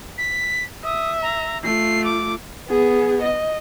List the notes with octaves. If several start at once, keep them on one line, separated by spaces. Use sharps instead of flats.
B6
E5 D#6
A#5
A3 F4 C7
D6
B3 G#4
D#5